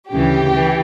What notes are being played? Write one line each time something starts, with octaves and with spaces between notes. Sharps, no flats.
D2 C#3 E3 G4
E3